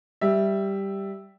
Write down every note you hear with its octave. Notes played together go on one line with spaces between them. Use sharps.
G3 E5